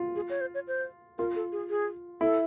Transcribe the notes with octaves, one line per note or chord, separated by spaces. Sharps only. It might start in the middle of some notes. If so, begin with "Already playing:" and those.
Already playing: F4
G#4
C#5
C5
C#5
C5
F4 A#4
A4
G#4
G#4
E4 A4